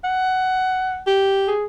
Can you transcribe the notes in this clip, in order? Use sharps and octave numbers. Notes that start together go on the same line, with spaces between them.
F#5
G4
G#4